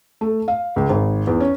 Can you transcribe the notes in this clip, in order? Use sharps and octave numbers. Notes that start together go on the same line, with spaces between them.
A3
F5
C#2
G#1
E2
C#4